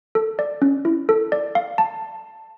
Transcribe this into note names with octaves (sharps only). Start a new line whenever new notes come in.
A4
D5
C#4
E4
A4
D5
F5
A5